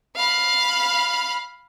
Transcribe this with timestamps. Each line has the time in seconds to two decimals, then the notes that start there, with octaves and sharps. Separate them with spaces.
0.17 F5 B5